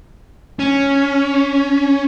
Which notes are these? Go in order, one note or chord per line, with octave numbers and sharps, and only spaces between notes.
C#4